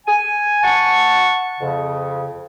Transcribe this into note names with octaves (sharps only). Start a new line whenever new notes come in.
G#5
F#5 A5 C#6
F2 C#3